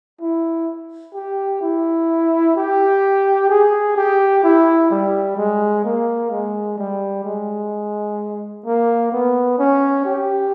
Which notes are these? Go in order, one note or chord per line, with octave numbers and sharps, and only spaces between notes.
E4
G4
E4
G4
G#4
G4
E4
G3
G#3
A#3
G#3
G3
G#3
A#3
B3
C#4
G4